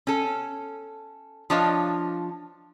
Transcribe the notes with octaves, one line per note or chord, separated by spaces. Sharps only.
C#4 A4
F3 D4 C#5 D#5 F5